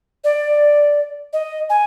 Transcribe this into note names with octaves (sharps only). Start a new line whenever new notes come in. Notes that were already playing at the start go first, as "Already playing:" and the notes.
D5
D#5
G#5